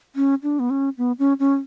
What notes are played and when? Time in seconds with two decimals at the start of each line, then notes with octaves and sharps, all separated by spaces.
0.16 C#4
0.43 D4
0.59 B3
0.70 C#4
0.98 B3
1.19 C#4
1.40 C#4